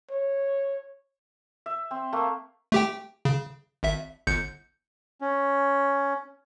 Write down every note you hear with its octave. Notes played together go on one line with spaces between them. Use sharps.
C#5
E5
C4
A3 A#3
A3 G4 G5
C#3
G#1 E5
G1 G6 C#7
C#4